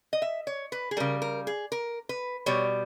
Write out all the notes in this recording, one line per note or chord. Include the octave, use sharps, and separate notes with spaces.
D#5
E5
C#5
B4
G#4
C#3 G3 A#4
A#4
G#4
A#4
B4
B2 G3 C#5